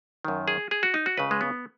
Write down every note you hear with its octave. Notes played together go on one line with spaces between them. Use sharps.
F#2 D#3
G#4
G#4
F#4
D#4
F#4
C#2 C#3 B4
G#3
B3